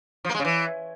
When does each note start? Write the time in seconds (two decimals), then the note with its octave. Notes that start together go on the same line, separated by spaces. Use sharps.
0.24 F3
0.30 A#3
0.35 G#3
0.40 C#3
0.45 E3